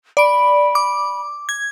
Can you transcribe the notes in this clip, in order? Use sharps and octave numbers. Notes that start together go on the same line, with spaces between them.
D5 B5 D7
D6
G#6